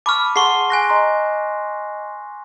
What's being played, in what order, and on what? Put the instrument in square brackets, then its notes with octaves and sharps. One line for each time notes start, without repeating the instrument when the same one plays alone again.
[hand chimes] A5 B5 C#6 [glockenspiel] D6 F6
[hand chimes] G#4 F#5 A5 [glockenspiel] C6 C#6 C7
[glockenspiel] G#5 F#6 A#6
[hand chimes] D#5 A#5 C6